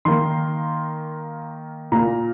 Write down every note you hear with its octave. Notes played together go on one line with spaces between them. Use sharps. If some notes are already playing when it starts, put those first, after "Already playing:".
D#3 A#3 C6
A#2 A#3 A#5